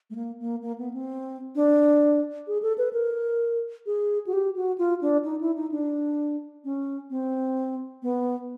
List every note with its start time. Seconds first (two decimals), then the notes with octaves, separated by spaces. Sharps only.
0.10 A3
0.15 A#3
0.40 A#3
0.62 A#3
0.78 B3
0.93 C4
1.55 D4
2.47 G#4
2.62 A4
2.78 B4
2.93 A#4
3.86 G#4
4.27 F#4
4.33 G4
4.56 F#4
4.78 F4
5.01 D4
5.25 D#4
5.41 E4
5.56 D#4
5.71 D4
6.64 C#4
7.10 C4
8.03 B3